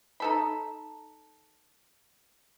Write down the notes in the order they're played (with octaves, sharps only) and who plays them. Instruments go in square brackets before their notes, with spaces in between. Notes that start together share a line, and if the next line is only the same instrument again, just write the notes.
[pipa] D#4 A4 B5